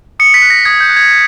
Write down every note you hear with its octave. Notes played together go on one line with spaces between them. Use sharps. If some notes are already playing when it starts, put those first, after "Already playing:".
D#6 C#7
B6
F#6
A#6
D#6 G#6
G6
F#6
G#6